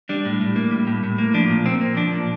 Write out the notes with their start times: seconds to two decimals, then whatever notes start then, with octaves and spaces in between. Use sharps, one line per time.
0.09 G3 D4
0.25 A2
0.41 A2
0.56 A#3
0.71 G3
0.87 A2
1.04 A2
1.18 A#3
1.34 F3 D4
1.50 A#2
1.65 A#2 C4
1.81 A#3
1.97 F3 D4
2.13 A#2